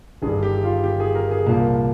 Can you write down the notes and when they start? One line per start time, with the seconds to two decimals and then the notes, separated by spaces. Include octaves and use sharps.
0.22 G1 G2 D#3 G3 G#4
0.43 G4
0.63 F4
0.84 G4
1.00 G#4
1.15 A#4
1.31 G#4
1.46 C2 A#2 F3 A#3